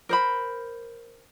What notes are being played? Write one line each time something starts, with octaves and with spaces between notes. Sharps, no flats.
A#4 C5 B5